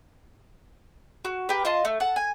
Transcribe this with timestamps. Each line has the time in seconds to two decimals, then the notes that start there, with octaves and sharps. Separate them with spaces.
1.25 F#4
1.49 G4 A#4 B4
1.65 F4 D#5 A5 C6
1.85 A3
2.00 F#5 A5
2.16 G#5